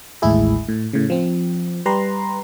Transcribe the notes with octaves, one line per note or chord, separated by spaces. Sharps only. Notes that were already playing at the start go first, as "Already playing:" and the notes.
A1 D#2 A2 G#3 E4 G#4
A2
A2 C#3
F3 C4
G3 G4 B4 A#5 C6